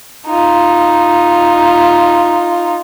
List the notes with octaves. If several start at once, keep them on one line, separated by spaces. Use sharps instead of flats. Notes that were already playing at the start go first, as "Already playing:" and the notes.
D#4 F4